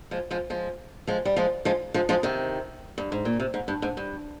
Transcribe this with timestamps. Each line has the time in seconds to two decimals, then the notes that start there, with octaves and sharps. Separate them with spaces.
0.11 F3 G#3
0.31 F3 G#3
0.50 F3 G#3
1.07 F3 G#3
1.25 G3
1.37 F3 G#3
1.65 F3 G#3
1.94 F3 G#3
2.09 F3 G#3
2.23 C3 D#3
2.98 G2
3.12 G#2
3.25 A#2
3.40 C3
3.54 G#2
3.68 G2
3.82 G#2
3.97 G2